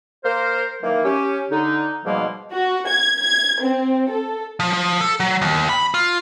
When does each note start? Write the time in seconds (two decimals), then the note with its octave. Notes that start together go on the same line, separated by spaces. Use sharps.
0.25 A#3 A#4 C5
0.83 D#3 E3 F#3 A#3
1.05 C#4 G4
1.51 D3 D#4
2.05 G#2 B2 F3 G3 G#3 A#3
2.52 F#4
2.88 G#6
3.21 G#6
3.63 C4
4.10 A4
4.60 F3
4.73 F3
5.01 A4
5.20 F#3
5.42 D#2
5.69 B5
5.94 F4